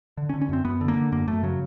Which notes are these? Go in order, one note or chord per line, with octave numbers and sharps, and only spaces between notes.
D3
C#4
D3
C#4
F#2 C4
F#2 B3
D3
A#3
D3
F#2 A#3
F#2 A3
C#3 F#3